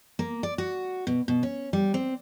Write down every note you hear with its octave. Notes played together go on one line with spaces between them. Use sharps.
A#3
D5
F#4
B2
B2
C#4
G3
C4